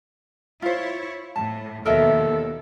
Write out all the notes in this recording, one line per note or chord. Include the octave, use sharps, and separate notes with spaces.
E4 F4 C5 C#5
A2 A5
D#2 B2 F3 A4 A#4 D#5 E5